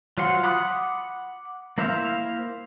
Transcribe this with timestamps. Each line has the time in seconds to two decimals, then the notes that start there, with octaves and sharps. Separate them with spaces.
0.18 F#3 F4 C5 F#5 C6
0.43 F#5 B5 D6 D#6 F#6
1.78 A#3 E4 C5 E5 F5